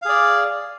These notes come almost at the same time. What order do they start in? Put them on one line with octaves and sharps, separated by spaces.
F5 G#4 D5